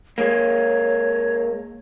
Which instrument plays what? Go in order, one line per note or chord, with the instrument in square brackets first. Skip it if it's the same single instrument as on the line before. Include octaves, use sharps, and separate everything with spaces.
[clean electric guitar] G#3 A#3 [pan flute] C#5